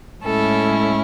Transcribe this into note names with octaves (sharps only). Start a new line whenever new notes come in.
A2 G#3 C#4 E4 A4